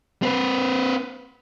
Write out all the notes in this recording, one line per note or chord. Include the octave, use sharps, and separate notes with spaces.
C4 B4